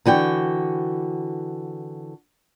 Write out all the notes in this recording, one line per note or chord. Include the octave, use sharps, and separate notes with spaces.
D3 E3 F#4 G5